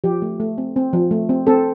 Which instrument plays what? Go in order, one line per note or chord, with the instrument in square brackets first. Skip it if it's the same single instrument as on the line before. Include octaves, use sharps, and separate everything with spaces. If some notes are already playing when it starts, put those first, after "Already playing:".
[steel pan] F3 G4
A3
A3
C4
C4
F3
A3
C4
C4 A4